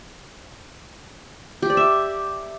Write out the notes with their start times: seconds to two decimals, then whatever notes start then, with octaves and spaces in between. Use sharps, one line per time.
1.62 G4
1.70 D5
1.77 E5